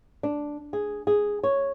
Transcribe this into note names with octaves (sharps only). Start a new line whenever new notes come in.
D4
G#4
G#4
C#5